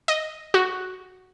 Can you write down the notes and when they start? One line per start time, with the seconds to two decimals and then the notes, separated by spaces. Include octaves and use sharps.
0.08 D#5
0.54 F#4